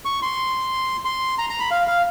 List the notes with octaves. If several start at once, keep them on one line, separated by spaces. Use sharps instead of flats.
C#6
C6
C6
A#5
A#5
B5
F5
F5